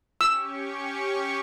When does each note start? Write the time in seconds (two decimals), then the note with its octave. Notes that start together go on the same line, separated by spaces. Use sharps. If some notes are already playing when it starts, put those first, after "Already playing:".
0.21 C#4 G4 C#6 E6